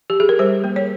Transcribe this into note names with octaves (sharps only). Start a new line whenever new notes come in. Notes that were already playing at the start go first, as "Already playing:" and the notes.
G4
G#4
A#4
G3 C5
A#3
C#5